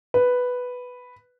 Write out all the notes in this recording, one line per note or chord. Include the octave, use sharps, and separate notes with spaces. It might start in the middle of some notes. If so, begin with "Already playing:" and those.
B4